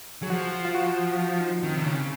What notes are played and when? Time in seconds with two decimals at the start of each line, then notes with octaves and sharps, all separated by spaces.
0.22 F#3 G#4
0.30 F3 F#4
0.53 F4
0.65 F4
0.75 F#4
1.12 F#4
1.19 F4
1.31 F4
1.40 D#4
1.63 D#3 C4
1.76 C3
1.85 C#3 A#3